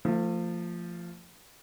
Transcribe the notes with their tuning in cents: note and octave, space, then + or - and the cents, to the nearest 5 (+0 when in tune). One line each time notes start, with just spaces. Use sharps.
F3 -10 A3 +35